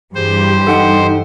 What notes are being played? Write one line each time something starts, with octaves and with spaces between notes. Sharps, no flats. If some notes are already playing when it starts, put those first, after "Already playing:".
G2 E3 G4 G#4 C5
D#4 A4 F#5 G5